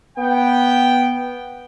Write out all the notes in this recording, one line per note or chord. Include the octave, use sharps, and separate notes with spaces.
B3 G5